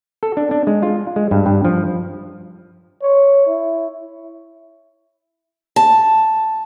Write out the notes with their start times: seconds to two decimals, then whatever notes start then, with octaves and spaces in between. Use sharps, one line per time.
0.23 A4
0.37 D4
0.51 D4
0.67 G#3
0.83 F4
1.16 G#3
1.31 G2
1.46 G2
1.65 F3
3.02 C#5
3.46 E4
5.76 A5